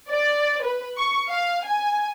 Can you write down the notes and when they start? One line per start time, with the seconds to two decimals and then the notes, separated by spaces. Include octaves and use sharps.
0.10 D5
0.64 B4
0.97 C#6
1.30 F5
1.67 G#5